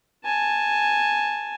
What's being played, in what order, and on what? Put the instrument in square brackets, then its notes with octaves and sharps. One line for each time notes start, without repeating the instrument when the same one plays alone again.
[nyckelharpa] G#5 A5